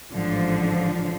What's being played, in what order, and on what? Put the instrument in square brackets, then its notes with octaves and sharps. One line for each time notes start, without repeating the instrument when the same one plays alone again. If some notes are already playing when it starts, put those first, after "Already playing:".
[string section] A1 G#2 D3 F3